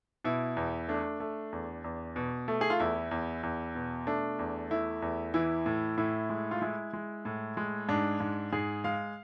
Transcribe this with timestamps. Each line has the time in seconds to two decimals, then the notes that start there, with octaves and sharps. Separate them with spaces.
0.24 B2 E4
0.57 E2
0.88 A3 D4
1.20 A3
1.52 E2
1.84 E2
2.16 B2
2.48 A3
2.61 G#4
2.70 F4
2.80 E2 E4
3.11 E2
3.43 E2
3.75 B2
4.07 A3 D4
4.39 E2
4.70 A3 E4
5.02 E2
5.34 E3 E4
5.66 A2
5.98 A2 E4
6.30 G#3
6.51 F4
6.61 G#3 E4
6.93 G#3
7.25 A2
7.57 G#3
7.89 G#2 D4
8.20 G#2
8.53 G#2 G#4
8.84 G#3 F5